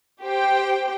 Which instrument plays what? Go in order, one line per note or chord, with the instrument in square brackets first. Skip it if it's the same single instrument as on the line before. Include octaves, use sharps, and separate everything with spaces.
[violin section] G4 C5 G5